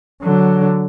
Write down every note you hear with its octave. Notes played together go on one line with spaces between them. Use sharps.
D3 F#3